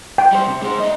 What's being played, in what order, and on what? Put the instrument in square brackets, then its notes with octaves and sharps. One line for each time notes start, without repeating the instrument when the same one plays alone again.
[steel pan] G5
[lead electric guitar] G3 C5
C3
G#3 C5
D4 D#5